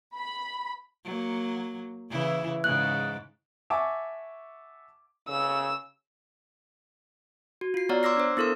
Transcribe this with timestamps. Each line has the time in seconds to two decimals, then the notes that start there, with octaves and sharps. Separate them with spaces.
0.15 B5
1.05 F#3 A#3
2.11 C#3 E3 E4
2.64 G#2 C#3 F#6
3.70 E5 F#5 G#5 A5 C#6 D6
5.28 C#3 E6
7.61 F#4
7.74 F4 C7
7.89 B3 C#5 D5 F#5 A#5 F6
8.03 C6 D6 E6 A#6 C7
8.17 D4 C5
8.37 B3 E4 A4 A#4 C6